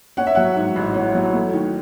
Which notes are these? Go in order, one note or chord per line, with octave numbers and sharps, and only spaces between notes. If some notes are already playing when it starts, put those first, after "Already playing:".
C#4 F#5
E5
F#3 F#5
G#2
A1
C#4
F#3
A3
D#3